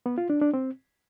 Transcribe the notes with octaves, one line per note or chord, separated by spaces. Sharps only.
B3
F4
D4
D4
C4